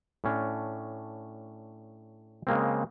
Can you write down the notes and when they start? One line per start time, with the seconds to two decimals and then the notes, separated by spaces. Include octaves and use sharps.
0.24 A2 C#4 D4
2.47 C#3 G#3 A#3 C4